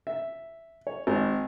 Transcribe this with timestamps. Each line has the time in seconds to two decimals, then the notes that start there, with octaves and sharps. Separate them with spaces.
0.07 E5
0.87 C#5
1.07 G#1